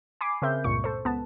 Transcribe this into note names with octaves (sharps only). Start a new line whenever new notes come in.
G#5 B5 D6 C7
C#3 C4 A#4 E5 G6
C#2 G2 A#2 C#6 C#7
A4 C5
C#2 B3 B4 A5